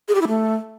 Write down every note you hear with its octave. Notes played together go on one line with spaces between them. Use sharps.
G#4
G4
E4
A3